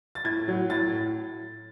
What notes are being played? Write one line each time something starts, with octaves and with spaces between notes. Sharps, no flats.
A6
A2 G#6
F#3
A2 A6